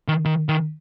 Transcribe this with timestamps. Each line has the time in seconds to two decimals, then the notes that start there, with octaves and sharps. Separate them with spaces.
0.08 D#3
0.25 D#3
0.49 D#3